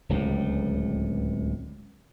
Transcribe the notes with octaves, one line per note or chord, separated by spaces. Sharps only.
D1 C#2 A2